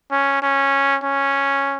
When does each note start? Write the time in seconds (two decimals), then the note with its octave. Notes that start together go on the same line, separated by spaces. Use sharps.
0.11 C#4
0.42 C#4
1.03 C#4